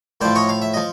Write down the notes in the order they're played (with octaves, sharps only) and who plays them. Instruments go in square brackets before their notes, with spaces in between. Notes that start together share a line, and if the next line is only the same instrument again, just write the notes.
[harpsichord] A2 F3 C5 D5
C#5 D#5
F5
E5
F3 D#5